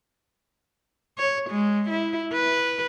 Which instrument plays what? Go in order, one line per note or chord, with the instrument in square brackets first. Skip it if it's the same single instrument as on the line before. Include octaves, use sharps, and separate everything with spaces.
[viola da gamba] C#5
G#3
E4
B4